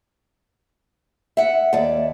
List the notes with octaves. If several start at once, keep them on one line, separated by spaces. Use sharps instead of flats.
E5 F#5
D#2 D5 A5